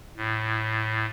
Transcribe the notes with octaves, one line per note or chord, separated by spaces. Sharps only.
A2